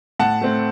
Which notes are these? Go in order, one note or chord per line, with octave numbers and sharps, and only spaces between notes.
A2 F#5 A5
A3 C4